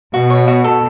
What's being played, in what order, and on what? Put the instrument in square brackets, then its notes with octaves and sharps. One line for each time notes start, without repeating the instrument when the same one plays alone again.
[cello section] B2 [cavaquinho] F#4
[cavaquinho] C#5
F#4
A4